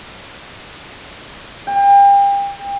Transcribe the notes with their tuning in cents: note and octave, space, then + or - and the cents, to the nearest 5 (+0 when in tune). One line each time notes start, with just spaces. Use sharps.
G5 +35